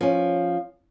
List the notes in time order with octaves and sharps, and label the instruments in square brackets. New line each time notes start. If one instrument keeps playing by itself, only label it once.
[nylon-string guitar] F3 C#4